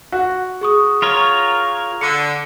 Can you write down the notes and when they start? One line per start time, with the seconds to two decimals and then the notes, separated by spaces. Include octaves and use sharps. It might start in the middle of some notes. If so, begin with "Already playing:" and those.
0.12 F#4
0.61 G#4 C#6 D#6
1.02 F4 A#4 C#5
2.01 D3 C#7